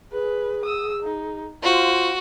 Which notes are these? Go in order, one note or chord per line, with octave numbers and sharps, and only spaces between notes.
G#4 B4
D#6 E6
D#4
F4 F#4 C5 F5